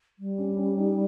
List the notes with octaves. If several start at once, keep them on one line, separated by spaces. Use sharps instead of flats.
G3
C#4
C#4
D#4